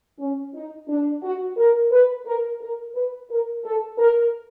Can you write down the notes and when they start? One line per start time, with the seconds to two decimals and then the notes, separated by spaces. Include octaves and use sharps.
0.19 C#4
0.54 D#4
0.88 D4
1.23 F#4
1.57 A#4
1.92 B4
2.26 A#4
2.61 A#4
2.95 B4
3.29 A#4
3.64 A4
3.99 A#4